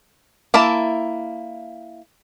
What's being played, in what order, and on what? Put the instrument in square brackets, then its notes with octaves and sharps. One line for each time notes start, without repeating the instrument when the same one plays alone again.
[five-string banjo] A#3 E4 E5 A5